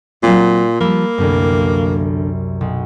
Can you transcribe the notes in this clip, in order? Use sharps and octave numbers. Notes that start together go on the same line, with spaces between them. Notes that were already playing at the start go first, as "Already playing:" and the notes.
A#2 F#3 C4
F3 G3 A#3 B5 E6
C2 F#2 D3 B3
B1